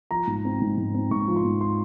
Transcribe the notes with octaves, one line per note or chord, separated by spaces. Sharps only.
F3 A#5
G#2
C4
G#2
G#2
C4
G#2 C#6
F3
C6
G#2
C6